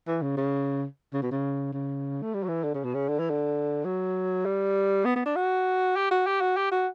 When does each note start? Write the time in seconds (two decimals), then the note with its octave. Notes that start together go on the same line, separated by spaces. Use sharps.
0.08 E3
0.22 C#3
0.37 C#3
1.14 C#3
1.23 B2
1.31 C#3
1.73 C#3
2.23 A3
2.34 G3
2.44 F#3
2.49 E3
2.64 D3
2.75 C#3
2.84 B2
2.94 C#3
3.09 D3
3.20 E3
3.30 D3
3.85 F#3
4.46 G3
5.05 B3
5.16 B3
5.26 D4
5.36 F#4
5.97 G4
6.11 F#4
6.27 G4
6.41 F#4
6.57 G4
6.72 F#4